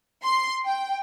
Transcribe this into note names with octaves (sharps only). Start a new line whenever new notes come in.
C6
G5